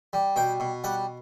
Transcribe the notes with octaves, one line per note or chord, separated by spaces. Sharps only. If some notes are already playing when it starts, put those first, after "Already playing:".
G3
B2 G5
B2
G3 F#5